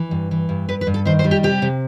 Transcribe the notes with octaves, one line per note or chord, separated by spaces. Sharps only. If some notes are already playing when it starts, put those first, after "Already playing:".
Already playing: E3
G2
E3
G2
G2 B4
B4
G2
A4
D#3 C5
C5
G3
G4
C3 G4
C3